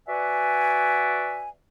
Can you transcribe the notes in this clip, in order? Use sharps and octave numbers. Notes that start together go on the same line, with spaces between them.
F#4 B4 D5 E5 F#5 G#5